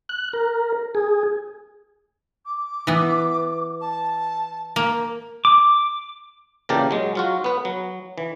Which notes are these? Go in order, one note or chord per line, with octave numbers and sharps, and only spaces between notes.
F#6
A#4
G#4
D6
E3 B3
A5
A#3
D6
A#2 C#3 E3 G4 A#4 A5
F#3 G#3
F#3 F4 F#4
B3 B4
F#3
E3